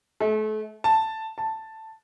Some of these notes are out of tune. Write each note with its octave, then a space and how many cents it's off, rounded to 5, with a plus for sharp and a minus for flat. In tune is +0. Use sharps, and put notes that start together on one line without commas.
A3 -35
A5 +5
A5 +5